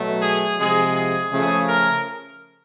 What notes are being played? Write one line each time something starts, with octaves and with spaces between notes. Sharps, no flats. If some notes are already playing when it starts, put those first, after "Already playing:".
Already playing: B2 F#3 A3
G#4
C3 F3 G#3 G#4
G#4
C#3 F3 A3
A#4